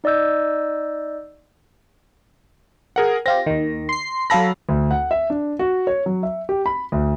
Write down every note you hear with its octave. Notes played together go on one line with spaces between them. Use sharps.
D#4 D5 D#5 E6 G6
G#4 A#4 F#5
C4 F4 G4 A#6
D#2 D#3
C6 C7
F#3 A4 F5 B5 A#6
D2
F#5
E5
D4
F#4
C#5
F#3
E5
G4
B5
D2